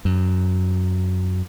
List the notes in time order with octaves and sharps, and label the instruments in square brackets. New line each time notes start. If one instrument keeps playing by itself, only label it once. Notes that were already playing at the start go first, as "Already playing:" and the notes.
[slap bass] F#2